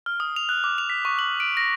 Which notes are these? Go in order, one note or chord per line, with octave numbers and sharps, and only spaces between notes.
F6
D#6
F7
F#6
D6
F7
B6
C#6
F#7
D7
A#6